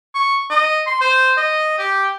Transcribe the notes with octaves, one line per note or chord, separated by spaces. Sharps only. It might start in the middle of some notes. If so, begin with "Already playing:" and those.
C#6
D#5
C6
C5
D#5
G4